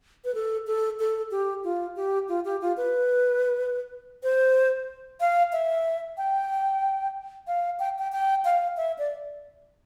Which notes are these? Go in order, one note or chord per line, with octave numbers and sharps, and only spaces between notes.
B4
A4
A4
A4
G4
F4
G4
F4
G4
F4
B4
C5
F5
E5
G5
F5
G5
G5
G5
F5
E5
D5